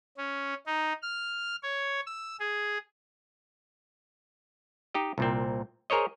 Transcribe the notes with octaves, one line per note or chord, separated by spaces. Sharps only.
C#4
D#4
F6
C#5
E6
G#4
D#4 G4 D#5
C2 A#2 C4
G#4 A#4 C5 C#5 D#5